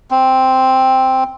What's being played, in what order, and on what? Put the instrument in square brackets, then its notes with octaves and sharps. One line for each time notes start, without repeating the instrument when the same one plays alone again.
[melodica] C4